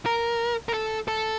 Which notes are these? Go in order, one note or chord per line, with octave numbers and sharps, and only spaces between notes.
A#4
A#4
A4
A4